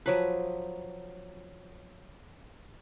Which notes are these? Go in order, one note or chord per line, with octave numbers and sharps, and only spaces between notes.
F3 F#3 B4